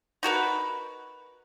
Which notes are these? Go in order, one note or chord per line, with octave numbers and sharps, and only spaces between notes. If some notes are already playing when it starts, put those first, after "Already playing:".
D#4 F#4 A#4 B4